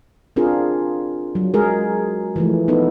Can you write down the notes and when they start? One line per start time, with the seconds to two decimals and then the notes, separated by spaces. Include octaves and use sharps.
0.36 C4 D4 F4 G#4 A#4
1.35 F#3
1.54 G#3 G#4 A#4
2.36 E3 F3 A3
2.68 B3 D#4 A4